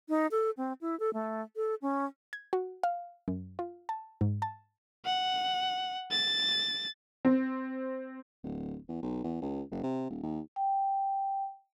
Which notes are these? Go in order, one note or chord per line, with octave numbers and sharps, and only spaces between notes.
D#4
A4
C4
E4
A4
A3
A4
C#4
G#6
F#4
F5
F#2
F4
A5
G#2
A5
F#5
A6
C4
D1
E2
B1
E2
C#2
F#1
C3
D#1
D#2
G5